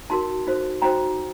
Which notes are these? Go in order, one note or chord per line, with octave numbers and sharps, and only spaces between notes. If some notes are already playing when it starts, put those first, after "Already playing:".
D#4 F#4 A#4 A5 C6
D#4 F#4 C5
D#4 F#4 C5 G5 A#5